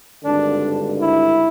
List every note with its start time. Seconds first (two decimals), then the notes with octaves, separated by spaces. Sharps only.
0.24 G#1 G2 D3 D4
0.99 E4